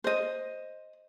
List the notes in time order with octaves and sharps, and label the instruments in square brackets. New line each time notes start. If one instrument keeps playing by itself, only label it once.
[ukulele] C5 D#5